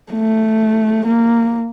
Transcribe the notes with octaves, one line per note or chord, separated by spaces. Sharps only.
A3
A#3